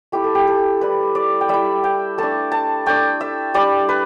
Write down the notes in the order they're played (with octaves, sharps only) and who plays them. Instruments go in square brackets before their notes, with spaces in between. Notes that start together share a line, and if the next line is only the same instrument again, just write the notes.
[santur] A3 E4 G4
A4
G4
A4
G3 E4 B4
D5
G5
G3 E4 E5
G5
A3 D4 A5
A5
A3 D4 G5
E5
G3 D4 D5
B4